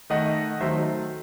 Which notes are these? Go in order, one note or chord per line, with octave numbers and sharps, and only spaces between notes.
D#3 A3 D#5 F#5
D#3 F#3 A3 C5 E5